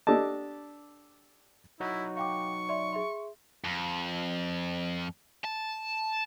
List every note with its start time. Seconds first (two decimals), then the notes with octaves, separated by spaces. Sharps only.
0.07 D4 G4 A4 D#5 A5
1.80 F#3 D#4 E4 F#4
2.17 F5 G5 C#6 D6
2.69 D5 E5 C6
2.93 G#4 E5 C6
3.64 F2
5.45 A5